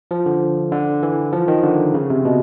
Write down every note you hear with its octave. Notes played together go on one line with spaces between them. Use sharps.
F3
D3
D3
E3
F3
D#3
D3
C#3
C3
B2